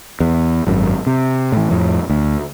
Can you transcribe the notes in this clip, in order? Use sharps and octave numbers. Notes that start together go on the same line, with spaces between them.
E2
G#1 F#2
C3
A2 E3
F2 A2
D2